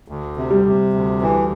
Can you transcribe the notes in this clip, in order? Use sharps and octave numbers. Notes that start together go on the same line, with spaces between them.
D2
C3
G3
C3
D2
E3